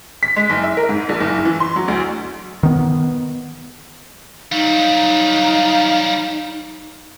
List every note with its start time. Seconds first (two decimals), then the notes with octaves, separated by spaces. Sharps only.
0.23 B6
0.36 G#3
0.50 F#1
0.64 E5
0.77 A#4
0.89 G#2
1.09 A#1
1.21 F#1
1.45 E3
1.60 C6
1.76 F#3
1.88 D2
2.63 D#3 B3
4.52 F#3 G3 D#4 F5